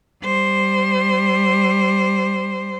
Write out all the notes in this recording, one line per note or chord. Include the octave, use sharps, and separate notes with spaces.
G3 C5